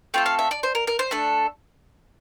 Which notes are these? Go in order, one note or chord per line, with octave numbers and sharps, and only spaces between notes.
A3 C4 F4 A4 G5
F5
E5
D5
C5
A#4
A#4
C5
A3 D4 A4